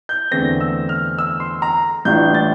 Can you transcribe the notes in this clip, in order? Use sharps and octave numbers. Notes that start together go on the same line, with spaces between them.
G6
E2 D3 A3 C4 A#6
E6
F6
E6
C6
A#5
A1 A2 G3 D4 F4 G6
A6